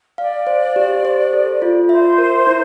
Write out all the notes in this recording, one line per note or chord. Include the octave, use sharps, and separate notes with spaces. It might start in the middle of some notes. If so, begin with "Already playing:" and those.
D5 F5
C5
G4
C5
A4
F4
C5 E5
A#4
E4